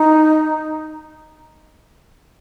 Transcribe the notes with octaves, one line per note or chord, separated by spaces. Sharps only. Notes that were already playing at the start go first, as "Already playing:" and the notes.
Already playing: D#4